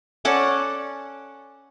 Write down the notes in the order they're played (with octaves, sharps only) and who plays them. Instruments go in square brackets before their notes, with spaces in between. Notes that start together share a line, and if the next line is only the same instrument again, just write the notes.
[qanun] C#4 A4 D5 F#5